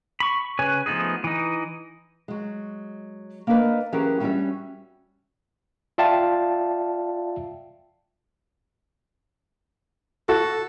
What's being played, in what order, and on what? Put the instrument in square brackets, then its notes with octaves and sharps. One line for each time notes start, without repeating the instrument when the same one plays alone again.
[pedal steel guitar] B5 C#6
C#3 B4 C#5 G#5 F#6
F3 A3 B3 D#4 G#4
E3 D#4
[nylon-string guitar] F#3 G#3
A#3 B3 D4 A#4 B4 D#5
E3 F#3 C#4 G4 G#4 A#4
G3 C#4 D4 E4 F#4 E5
[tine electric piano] F4 D5 E5 F5 G5 A5
[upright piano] F#4 [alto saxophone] A4